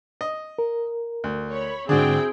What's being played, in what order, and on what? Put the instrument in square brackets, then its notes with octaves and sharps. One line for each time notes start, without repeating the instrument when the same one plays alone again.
[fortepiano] D#5
[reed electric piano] A#4
[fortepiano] D2
[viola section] C#5 B5
[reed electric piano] G#2 D3 [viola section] C4 E4 G5 [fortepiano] D4 F#4 [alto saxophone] G#4